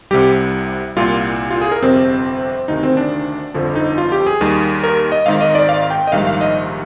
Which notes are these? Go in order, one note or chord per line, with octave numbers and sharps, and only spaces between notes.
C2 C3 G3 G4
C2 A#2 G3 F4
F4
G#4
A#4
G1 F2 C3 C4
D2 C3 D#3 D#4
C4
D4
G1 F2 D3 F3
D#4
F4
G4
G#4
D#2 D#3 G3
A#4
D#5
G#1 G#2 D#3 F5
D#5
D5
F5
G5
D#5
A#1 G#2 D#3 G3 F5
F5
D#5